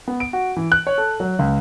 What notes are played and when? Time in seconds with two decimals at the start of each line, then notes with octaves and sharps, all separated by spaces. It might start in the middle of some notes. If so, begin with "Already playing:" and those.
0.08 B3
0.20 D7
0.33 F#4
0.57 E3
0.72 F#6
0.87 C#5
0.98 A4
1.20 F#3
1.39 C#2